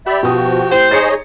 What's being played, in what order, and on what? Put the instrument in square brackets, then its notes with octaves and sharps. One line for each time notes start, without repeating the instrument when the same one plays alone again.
[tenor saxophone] G4 [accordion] D5 E5 B5
[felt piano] B2 G5 D#6 [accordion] F3 F#4
[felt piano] A2 [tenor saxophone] G4 [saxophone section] C5
[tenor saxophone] D#4 [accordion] G#4 C#5 D#5 [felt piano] A6 C#7